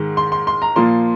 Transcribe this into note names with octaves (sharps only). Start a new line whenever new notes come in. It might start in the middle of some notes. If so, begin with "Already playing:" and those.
Already playing: G#2 D#3 G#3
C6
C6
C6
A#5
A#2 F3 A#3 C6